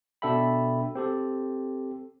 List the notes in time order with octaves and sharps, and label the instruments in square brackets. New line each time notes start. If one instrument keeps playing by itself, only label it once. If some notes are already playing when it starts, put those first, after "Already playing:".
[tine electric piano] B2 D4 A4 E5 G5 B5
C4 G4 A4